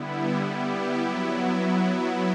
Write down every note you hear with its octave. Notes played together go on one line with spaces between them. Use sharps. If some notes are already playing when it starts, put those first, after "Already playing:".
Already playing: D3 G3 B3 E4
G3 B3 E4 G4
F#3 B3 E4